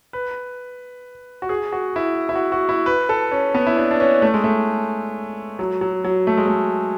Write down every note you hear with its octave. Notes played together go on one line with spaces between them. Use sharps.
B4
F#4
G#4
F#4
E4
E4
F#4
F#4
E4
B4
A4
C#4
B3
E4
D4
D4
C#4
A3
G#3
A3
F#3
F#3
F#3
A3
G#3
A3